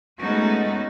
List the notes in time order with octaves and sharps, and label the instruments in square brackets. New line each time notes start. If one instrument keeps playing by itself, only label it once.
[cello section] G#3 A3 B3 C#4 D#4 F#4